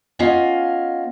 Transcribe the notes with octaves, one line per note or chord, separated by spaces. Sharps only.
B3 C#4 F4 D#5 F5 G#5